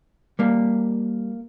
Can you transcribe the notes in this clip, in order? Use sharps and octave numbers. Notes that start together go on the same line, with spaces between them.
G3 A#3